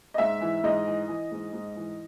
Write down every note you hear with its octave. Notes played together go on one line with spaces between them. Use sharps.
D#5
G#2 E5
E3
G#2 D#5
E3
E3
G#2
G#2
E3